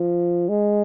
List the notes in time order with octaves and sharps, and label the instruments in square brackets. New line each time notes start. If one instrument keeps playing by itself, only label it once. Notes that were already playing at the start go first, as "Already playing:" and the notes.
Already playing: [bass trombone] F3
G#3